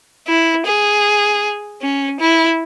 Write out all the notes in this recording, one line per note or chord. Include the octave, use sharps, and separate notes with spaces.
E4
G#4
C#4
E4